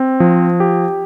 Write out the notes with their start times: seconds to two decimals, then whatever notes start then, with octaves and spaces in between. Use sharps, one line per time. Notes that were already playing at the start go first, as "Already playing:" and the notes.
Already playing: C4
0.20 F3
0.60 G4